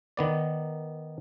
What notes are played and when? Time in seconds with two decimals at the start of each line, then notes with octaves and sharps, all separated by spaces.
0.17 D#3 B3 D5